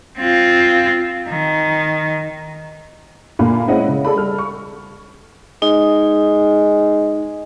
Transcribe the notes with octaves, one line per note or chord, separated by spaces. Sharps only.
C4 F4
D#3
A#2 D3 A3 A#3 F5 B5
G#3 C4 C#4 E4 D#5 F#5
C#3
G#4 A4 D5 B5
G3 A4 F6
C#6
G#3 D#4